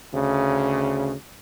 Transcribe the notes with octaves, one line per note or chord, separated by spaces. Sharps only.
D2 C#3